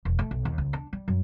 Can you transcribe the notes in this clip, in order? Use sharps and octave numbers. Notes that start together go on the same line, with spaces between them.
E1
A3
B1
D#2
C#2
D4
G3
F#2